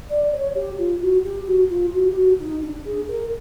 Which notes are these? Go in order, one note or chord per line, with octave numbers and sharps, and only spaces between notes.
D5
C#5
G4
F4
F#4
G4
F#4
F4
F#4
G4
F#4
D#4
D4
G#4
A#4